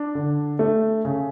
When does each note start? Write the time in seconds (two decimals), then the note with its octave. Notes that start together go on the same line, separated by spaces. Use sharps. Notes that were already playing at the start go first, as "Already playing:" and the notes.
Already playing: D4
0.15 D3
0.59 A3
1.05 C#3